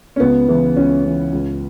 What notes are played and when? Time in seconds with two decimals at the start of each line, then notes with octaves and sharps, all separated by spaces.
0.16 C#4
0.20 C#2 B3
0.48 C#3 E3
0.76 C#2 C#4
1.04 C#3 E3
1.33 C#2